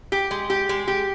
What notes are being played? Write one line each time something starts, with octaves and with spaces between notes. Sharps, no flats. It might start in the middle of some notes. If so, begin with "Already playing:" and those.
G4
G#3
G4
G#3
G4